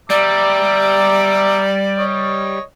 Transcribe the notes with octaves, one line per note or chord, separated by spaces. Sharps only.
G3 D5 E5 A#5 D6
C#5 D#5